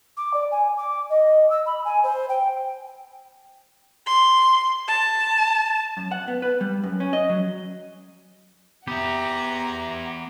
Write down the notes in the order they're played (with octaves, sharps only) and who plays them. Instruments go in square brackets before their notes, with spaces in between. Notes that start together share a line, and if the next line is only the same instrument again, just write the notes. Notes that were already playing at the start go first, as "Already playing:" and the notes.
[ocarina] D6
D5
G#5
D6
D#5
E6
B5
G#5
C5
G5
[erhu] C6
A5
[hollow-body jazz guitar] F#2
F#5
B3
B4
G3
F#2
C#4
D#5
F#3
[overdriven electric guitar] B3 E5 [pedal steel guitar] G4 [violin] F#5 A#5